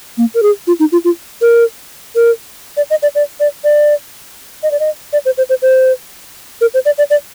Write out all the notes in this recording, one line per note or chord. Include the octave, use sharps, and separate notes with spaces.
A#3
A#4
G#4
F4
D#4
F4
F4
A#4
A#4
D5
D#5
D5
D5
D5
D5
D#5
D5
D#5
D5
C5
C5
C5
C5
A#4
C5
D5
D5
D5